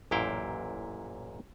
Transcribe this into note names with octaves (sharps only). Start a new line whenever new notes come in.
A1 F#2 A#2 E4 F5 G5